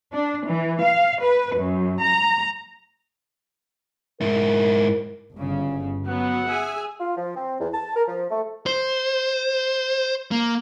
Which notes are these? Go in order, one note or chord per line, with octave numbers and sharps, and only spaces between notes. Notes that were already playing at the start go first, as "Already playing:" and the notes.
D4
E3
F5
B4
F#2
A#5
G#2 E4 A#4
G1 C#3
F#3 B3 F#5
G#4 E5 G#5
F4
F3
C4
E2
A5
A#4
F3
A3
C5
A#3